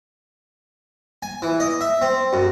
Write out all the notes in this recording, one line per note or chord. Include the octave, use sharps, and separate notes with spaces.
G#5
E3
D#5
E5
C4
F#2